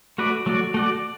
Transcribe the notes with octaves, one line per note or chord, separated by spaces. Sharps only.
A3 F#4 B4 D5
F#3 A3 F#4 D5
A3 F#4 D5